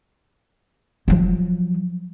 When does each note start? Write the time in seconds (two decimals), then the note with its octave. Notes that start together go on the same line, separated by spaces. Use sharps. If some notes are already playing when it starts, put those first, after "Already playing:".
1.08 F3 F#3